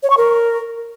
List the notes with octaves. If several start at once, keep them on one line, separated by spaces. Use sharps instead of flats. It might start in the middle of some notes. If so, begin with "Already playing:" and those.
C#5
C#6
A#4